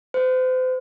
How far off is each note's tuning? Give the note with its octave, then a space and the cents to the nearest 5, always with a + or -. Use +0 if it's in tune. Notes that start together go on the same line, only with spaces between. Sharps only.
C5 -40